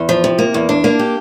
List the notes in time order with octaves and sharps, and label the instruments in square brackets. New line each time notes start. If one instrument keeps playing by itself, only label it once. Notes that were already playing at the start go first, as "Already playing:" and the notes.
Already playing: [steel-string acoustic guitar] E2
F3
C3
A#3
E2
D4
A#3
G4